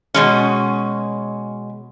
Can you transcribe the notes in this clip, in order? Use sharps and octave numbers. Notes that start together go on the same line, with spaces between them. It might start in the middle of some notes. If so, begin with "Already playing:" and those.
B2 G#3 C#4